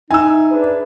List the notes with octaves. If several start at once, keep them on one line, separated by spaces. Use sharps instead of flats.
D#4 E4 G#5 E6
D4 G#4 B4